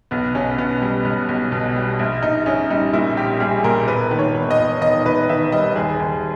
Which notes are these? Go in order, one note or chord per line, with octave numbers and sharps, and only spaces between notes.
B1 B3
B2 C#4
B1 B3
G3
B1
B1
B2
G3
A#1
A#1 D#4
A#1 C#4
G3 D#4
A#2 E4
A#1 G4
G3 G#4
A#2 A#4
E1 B4
D#3
C#5
E1
D#5
E1
E1 D#5
E1 B4
D#3 E5
G3 D#5
D#2 G#4
D#2